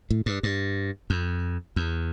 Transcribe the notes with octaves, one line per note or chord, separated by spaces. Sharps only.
A2
G2
G2
F2
E2